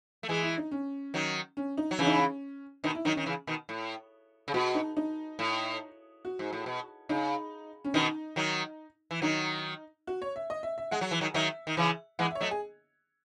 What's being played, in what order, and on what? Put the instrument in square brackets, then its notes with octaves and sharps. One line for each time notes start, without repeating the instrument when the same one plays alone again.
[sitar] A3
[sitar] E3 G#3 [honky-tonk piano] G#4
[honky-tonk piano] E4
D#4
C#4
[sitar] D#3 F#3
[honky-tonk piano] C#4
D#4
[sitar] F#3
[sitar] C#3 E3 [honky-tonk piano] C#4
[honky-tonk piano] D#4
C#4
[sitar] B2 D#3 [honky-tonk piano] D#4
[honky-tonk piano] E4
[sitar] D#3 F#3 [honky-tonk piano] D#4
[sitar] D#3 [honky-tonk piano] C#4
[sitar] C#3 E3
B2 D#3
A2
C#3
[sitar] B2 [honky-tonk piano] F#4
[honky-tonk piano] D#4
D#4
[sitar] A2
[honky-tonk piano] F#4
[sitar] G#2
A2
B2
[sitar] C#3 [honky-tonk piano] D#4
[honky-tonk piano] C#4
[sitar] B2 D#3 [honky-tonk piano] D#4
[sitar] D#3 F#3
E3
[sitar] D#3 F#3 [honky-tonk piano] D#4
[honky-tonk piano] F#4
C#5
E5
D#5
E5
E5
[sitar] G#3 [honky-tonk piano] F#5
[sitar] F#3
E3
D#3 F#3
[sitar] D#3 F#3 [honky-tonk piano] E5
[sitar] D#3
C#3 E3
[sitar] E3 G#3 [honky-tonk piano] F#5
[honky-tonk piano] E5
C#5
[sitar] F#3 A3 [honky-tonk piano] D#5
[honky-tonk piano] G#4